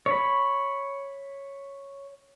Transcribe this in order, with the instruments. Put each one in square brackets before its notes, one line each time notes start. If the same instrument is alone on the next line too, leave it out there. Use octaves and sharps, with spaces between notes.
[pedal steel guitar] C#5 B5